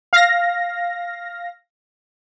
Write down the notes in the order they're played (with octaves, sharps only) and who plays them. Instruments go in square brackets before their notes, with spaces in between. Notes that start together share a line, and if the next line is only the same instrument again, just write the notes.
[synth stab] F5 A#6